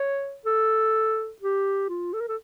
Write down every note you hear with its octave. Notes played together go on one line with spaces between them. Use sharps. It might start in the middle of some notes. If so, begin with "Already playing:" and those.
Already playing: C#5
A4
G4
F4
A4
A#4
A4